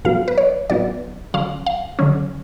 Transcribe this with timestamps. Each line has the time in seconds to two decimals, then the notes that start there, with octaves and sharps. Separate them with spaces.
0.05 A2 F#3 B3 F5
0.28 B4
0.38 C#5
0.70 A2 F#3 B3 D5
1.34 D3 F#3 C#4 F5
1.66 F5
1.99 D3 F#3 C#4